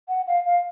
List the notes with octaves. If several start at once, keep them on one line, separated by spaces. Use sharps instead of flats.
F#5
F5
F5